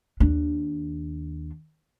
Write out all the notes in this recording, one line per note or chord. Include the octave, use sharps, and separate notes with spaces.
D#2 D4